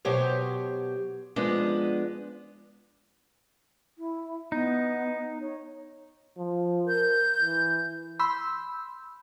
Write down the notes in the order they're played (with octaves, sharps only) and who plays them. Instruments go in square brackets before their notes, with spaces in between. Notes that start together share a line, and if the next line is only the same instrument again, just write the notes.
[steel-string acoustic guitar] B2 F#3 G4 C5 C#5
F3 G#3 B3 D4
[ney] E4
[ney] B3 [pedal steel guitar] D#4
[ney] C#5
[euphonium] F3
[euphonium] A#4 [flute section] G6
[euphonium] E3
[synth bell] B5 C6 E6 G6